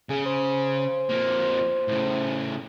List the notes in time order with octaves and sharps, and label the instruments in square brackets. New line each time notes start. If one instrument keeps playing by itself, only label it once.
[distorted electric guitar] C#3 [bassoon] G#4
[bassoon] C5
[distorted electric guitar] F2 A#3
A2 C#3